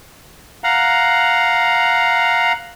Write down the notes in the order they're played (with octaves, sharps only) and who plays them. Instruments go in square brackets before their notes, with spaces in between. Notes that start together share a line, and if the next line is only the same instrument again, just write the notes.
[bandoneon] F5 F#5 A#5